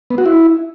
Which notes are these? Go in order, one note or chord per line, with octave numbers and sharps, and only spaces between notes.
B3
F#4
E4